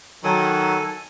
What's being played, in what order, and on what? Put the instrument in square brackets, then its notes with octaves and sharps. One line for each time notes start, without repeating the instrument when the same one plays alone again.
[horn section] D#3 F#3 [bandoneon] A4 G#5